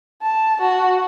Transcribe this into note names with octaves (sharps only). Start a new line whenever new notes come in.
A5
F#4